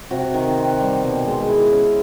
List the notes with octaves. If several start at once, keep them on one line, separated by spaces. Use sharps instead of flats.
C3 F#4
D#3
C4
G3
B2
G#3
E4
C#4